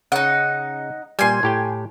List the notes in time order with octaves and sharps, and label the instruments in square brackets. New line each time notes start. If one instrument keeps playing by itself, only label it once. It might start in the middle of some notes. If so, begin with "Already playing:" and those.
[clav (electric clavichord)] C#3 [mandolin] D#4 F#5
[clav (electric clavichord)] A#2 G3 [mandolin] G#5 C6
[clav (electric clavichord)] A2 G4 G5